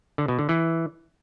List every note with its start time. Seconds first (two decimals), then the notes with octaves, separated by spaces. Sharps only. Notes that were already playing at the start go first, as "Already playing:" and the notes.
0.18 D3
0.28 B2
0.39 D3
0.49 E3